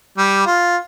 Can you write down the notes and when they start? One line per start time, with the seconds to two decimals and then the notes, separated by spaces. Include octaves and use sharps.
0.18 G3
0.46 F4